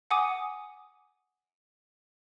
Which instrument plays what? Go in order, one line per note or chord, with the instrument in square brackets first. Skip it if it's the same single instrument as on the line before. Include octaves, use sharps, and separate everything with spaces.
[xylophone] F#5 G#5 D6 D#6 D#7